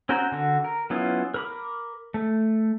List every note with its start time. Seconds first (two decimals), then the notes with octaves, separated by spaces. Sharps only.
0.09 C4 C#4 F#4 A#4 C5
0.32 D3 F#4
0.64 A#4
0.90 F#3 B3 C#4 E4 F4
1.34 A#4 B5 D6
2.14 A3